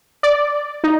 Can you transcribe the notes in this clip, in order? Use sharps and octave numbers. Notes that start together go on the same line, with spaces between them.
D5
D#4